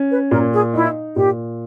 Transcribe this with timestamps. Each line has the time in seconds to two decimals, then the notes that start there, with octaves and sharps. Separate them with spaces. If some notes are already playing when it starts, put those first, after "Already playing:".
Already playing: C#4
0.10 B4
0.31 A#2 A#4
0.53 G#4
0.74 D#4 E4
1.16 A#2 G4